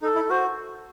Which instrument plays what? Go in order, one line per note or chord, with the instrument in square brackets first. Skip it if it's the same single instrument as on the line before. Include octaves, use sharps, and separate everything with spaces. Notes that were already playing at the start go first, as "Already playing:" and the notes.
[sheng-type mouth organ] D#4 [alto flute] A4
[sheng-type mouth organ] E4
[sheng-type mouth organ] F#4 [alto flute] C5